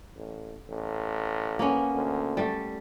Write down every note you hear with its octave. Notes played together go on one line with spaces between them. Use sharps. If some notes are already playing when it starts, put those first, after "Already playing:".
A1
A1
A#3 B3 C#4
D2
G3 A3